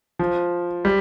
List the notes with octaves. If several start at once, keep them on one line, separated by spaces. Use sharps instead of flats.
F3
G3